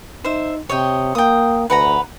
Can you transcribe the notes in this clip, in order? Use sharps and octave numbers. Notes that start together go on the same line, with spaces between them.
D#4 C5 E5
C3 C#5 D#5 G5
A#3 G5 D#6
D2 B4 F#5 A#5